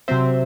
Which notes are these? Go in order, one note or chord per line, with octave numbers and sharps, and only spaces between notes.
C3 F#3 C4 C5 E5